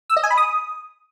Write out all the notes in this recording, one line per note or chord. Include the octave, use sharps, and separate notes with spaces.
E6
D#5
G#5
B5
D#6